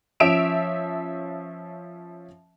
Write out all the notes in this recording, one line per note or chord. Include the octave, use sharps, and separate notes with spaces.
F3 C#4 E5 D7 E7 F7